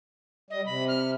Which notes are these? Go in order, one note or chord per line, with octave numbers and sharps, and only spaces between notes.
G3 D#5
C3 B5
F6